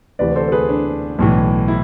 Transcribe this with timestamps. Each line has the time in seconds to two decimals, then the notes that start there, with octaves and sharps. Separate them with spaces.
0.19 D2 C3 E3 B4 D5
0.36 A4 C5
0.48 A4
0.52 G#4 B4
0.69 D4
1.19 B1 A2 E3
1.68 E4